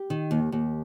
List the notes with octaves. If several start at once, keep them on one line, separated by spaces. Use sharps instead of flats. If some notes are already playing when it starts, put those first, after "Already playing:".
Already playing: G4
D#3
D#2
D#2